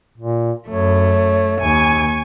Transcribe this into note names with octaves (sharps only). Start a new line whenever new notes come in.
A#2
F#2 A3 C#5
D#2 G#5 C#6